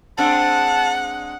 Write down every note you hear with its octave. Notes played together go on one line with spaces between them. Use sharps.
G#3 C4 D4 F#5 A5